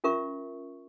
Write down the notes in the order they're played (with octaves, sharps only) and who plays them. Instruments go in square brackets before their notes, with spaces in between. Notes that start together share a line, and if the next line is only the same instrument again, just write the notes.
[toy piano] C#4 F4 A#4 E5 C#6